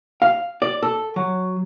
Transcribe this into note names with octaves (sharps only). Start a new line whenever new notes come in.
F5
D5
A4
F#3